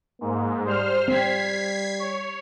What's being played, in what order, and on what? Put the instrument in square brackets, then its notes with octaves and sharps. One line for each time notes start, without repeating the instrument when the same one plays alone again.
[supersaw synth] G#2 [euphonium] A#3
[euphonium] G3 [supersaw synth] C5 F6
[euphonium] G3 [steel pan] C4 [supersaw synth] G#6 B6 C7
[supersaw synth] C#5